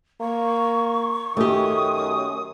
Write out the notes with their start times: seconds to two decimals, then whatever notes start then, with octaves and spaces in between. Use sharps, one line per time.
0.21 A#3 C#6
1.37 F#2 D#3 A3 G4 D#6